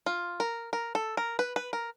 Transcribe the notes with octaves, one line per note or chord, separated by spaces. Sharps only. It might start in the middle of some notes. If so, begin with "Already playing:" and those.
F4
A#4
A#4
A4
A#4
B4
B4
A#4